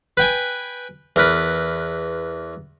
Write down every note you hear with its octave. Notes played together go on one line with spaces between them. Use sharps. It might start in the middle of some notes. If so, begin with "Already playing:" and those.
B4 G5 G#5
E2 A#4 B4